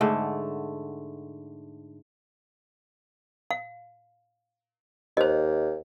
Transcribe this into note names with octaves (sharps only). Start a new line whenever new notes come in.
G#2 D3 A3
F5
D#2 C5 D#5